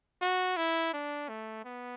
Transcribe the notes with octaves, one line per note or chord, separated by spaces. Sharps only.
F#4
E4
D4
A3
B3